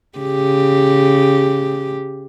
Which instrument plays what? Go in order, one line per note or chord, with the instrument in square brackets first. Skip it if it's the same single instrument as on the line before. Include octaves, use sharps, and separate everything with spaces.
[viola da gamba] C#3 G4